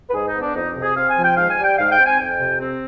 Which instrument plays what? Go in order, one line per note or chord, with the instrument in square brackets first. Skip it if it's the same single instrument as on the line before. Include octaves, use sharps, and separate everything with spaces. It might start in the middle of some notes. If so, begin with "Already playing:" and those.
[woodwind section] B4
G#2 G#4
D#4
B3
D4
F2 D#4
C3
G#4
C4 F5
G#5
F3
G5
G#2 F5
G#5
G3
G5
G#2 F5
G5
C4
G#5
F2 G5
C3
C4